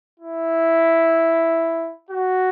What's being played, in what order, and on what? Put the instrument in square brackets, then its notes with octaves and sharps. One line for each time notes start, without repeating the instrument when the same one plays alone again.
[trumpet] E4
F#4